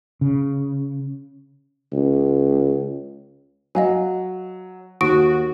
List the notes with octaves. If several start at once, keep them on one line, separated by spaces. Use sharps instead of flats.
C#3
C#2
F#3 D#5 F5 G#5
D#2 F#4 D#6 D7